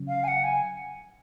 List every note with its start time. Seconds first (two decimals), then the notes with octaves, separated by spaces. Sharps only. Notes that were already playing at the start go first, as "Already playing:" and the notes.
Already playing: C#3 F#3 C#4
0.08 F5
0.23 G#5
0.27 F#5
0.43 G#5